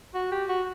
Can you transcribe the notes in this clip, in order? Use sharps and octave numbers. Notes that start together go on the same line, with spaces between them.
F#4
G4
F#4